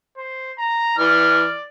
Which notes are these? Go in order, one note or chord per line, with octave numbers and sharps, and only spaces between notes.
C5
A#5
E3 D5 F6